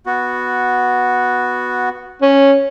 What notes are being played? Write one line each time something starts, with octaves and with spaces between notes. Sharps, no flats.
B3 F#4
C#4